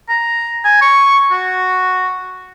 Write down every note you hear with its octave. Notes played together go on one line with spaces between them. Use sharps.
A#5
G#5
C#6
F#4